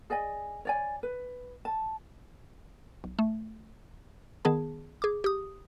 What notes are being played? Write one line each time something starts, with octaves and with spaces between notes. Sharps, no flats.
G#4 D5 D#5 G#5
C#5 D5 G#5
B4
A5
B1
A3
D#3 B3 G#4 A5
G#4 D6
G4 D#6